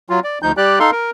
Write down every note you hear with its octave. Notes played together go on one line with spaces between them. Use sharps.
F#3 F4
D5
D2 F3 D#4 G6
G3 G4 D5 F#6
D#4 A4 F5 C6
A#4